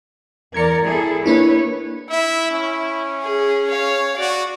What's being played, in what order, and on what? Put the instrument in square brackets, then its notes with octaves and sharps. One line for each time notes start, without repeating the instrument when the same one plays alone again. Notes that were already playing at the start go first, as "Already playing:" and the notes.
[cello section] E2 A#4 D5 [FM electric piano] G#6 C#7
[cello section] E4 G#4 A4
[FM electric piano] A#3 D4 E4 [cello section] B4 C#5
[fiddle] E4 [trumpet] E5
[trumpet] C#4
[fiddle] G#4
C#5 F5
[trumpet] F#4 [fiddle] D5